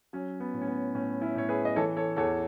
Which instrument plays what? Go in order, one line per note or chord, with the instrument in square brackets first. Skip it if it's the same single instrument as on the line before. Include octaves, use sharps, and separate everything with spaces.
[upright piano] F#3 C#4
B3
A2
C#4
B3
A2 C#4
C#4 E4
A2 C#5
G#4 B4
D#5
E3 A4 C#5
A4 C#5
E2 A4 C#5